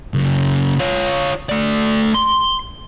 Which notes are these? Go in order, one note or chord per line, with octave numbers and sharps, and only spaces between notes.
F#2 C#3
F4 C#5
A3 D5
C6